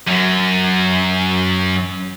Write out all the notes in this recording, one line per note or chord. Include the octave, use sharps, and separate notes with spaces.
F#2 F#3